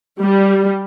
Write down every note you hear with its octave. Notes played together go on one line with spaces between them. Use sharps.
G3